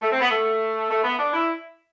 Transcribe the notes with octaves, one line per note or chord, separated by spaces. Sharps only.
A3
C4
B3
A3
A3
B3
D4
E4